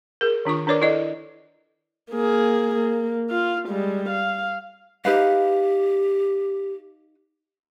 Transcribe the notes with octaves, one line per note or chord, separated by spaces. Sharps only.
G#4 A#4
D#3 D4 F4 C#6
D4 A#4 B4 C#5 D5 D6
E4 A4 B4 D5 D#5
A#3 G#4
A#3
F4 F5
G3 G#3
F5
D#4 G4 B4 F5